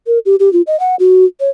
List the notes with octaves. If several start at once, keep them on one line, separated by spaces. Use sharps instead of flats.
A#4
G4
G4
F4
D#5
F#5
F#4
C#5